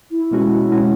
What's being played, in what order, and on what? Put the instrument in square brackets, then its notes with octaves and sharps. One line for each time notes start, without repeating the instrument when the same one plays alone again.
[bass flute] E4
[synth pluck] B2 G#3 C#4 F#4
B2 G#3 C#4 F#4